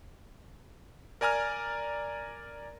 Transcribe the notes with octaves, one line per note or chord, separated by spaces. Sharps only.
A#4 D5 G#5 A#5 F6